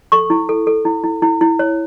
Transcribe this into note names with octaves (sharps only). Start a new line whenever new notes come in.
A4 C#6
E4
A4
A4
E4
E4
E4
E4
C#5